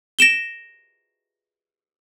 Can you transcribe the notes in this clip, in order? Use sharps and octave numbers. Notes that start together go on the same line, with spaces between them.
A#6 D7 E7 G7